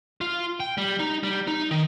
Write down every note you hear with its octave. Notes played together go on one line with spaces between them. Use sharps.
F4
G5
G3
D#4
G3
D#4
D#3